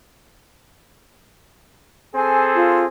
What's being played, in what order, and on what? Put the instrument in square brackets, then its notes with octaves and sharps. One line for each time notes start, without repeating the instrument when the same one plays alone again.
[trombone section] C4 G#4 A4 [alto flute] G#5
[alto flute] F4